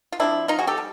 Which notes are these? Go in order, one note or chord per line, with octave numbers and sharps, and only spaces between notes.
F4
F3 A3 C4 D4 E4
D#4 F4
F#4 G#4
G4 A4
G3